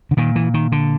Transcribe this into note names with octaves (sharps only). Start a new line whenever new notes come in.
D3
A#2 D#3
E3
D#3
D3